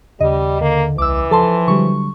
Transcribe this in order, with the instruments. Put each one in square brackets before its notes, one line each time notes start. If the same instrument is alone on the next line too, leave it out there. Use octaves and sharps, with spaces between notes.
[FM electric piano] D#2 C#3 [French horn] G3 [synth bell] D#5
[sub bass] D3 [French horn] A#3
[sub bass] C2 [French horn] E3 [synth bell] D6 E6
[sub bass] F3 [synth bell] A4 A5 C6
[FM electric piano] D3 F#3 G3 [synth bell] C#6